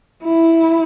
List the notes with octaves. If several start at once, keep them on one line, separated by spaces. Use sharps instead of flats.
E4